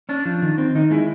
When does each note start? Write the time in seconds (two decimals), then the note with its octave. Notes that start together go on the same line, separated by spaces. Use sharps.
0.09 C#4 D4
0.25 F3
0.42 D#3
0.58 C4
0.75 D#3 D#4
0.91 G#3 E4